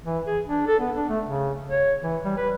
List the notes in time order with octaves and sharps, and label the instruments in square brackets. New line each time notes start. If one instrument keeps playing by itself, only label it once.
[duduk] E3
G#4
D4
A4
B3
D4
A3
C#3
C#5
E3
G3
B4